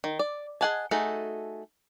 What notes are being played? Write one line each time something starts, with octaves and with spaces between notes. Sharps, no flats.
D#3
D5
G#4 D#5 F#5 G#5 A5
A3 D#4 F#4 G#4 A4